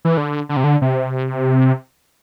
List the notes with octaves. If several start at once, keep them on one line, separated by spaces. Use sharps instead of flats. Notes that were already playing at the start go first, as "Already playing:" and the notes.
E3
D3
D3
C3
D3
C3